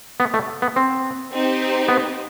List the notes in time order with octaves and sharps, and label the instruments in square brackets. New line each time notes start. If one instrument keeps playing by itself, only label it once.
[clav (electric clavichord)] B3
A3
B3
C4
[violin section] C4 D#4 G4 C5
[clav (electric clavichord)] B3